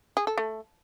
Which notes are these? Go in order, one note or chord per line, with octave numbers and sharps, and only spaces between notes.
G#4
A4
A3